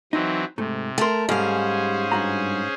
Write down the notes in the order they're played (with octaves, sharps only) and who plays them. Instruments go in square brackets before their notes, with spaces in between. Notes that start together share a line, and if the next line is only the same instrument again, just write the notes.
[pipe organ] E3 F#3 C4 [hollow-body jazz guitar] D#4
[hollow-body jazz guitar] G#2 A3 [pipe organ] C3
[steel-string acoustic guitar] A3 A#4 [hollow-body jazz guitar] G5 C6
[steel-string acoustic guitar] G#2 F5 [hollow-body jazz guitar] G3 [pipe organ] C#4 G#4 C5
[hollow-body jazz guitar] G2 F#4 A#5